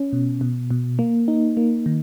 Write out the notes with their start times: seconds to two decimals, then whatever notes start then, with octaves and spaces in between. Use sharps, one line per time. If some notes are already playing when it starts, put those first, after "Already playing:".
Already playing: C#4
0.13 B2
0.41 B2
0.71 B2
0.99 A#3
1.28 D#4
1.57 A#3
1.86 D#3